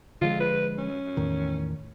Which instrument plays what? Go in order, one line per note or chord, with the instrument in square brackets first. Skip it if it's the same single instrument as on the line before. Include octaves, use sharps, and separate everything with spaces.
[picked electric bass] D3 F3 G#3 [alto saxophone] F4
[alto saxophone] B4
C#4
[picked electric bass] E2 A2 D#3